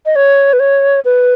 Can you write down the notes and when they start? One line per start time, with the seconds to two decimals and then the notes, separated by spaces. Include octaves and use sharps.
0.06 D#5
0.16 C#5
0.53 B4
0.60 C#5
1.05 B4